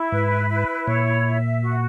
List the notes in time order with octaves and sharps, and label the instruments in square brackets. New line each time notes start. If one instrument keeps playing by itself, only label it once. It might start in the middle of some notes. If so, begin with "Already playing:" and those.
Already playing: [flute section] E4
[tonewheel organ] G#2 [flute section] B4
[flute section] E4
[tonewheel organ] A#2 [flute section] C#5
[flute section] E5
F#4